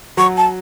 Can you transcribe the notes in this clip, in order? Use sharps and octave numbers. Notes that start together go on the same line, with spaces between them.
F#3 C#6
A5